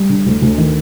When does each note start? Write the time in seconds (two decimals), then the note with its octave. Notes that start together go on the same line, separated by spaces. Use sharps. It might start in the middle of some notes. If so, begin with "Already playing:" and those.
Already playing: G3
0.09 D3
0.26 D2
0.42 D2
0.58 D#3